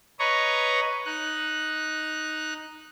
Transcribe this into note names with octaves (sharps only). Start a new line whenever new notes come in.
B4 C#5 D#5 A#5 C#6
D#4 F#6